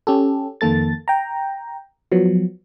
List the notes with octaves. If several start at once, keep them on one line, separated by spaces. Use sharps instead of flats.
C#4 G4 A4
F2 D#3 A#3 A4 A6
G5 A#5
F3 F#3 B3